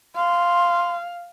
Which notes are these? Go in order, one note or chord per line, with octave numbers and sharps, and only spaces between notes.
F5 C6